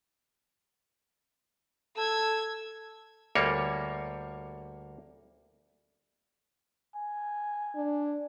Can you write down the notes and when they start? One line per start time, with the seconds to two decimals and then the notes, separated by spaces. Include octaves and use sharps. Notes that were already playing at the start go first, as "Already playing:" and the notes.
1.97 A4 E6 G#6
3.35 D2 G3 A#3 C#5
6.96 G#5
7.76 D4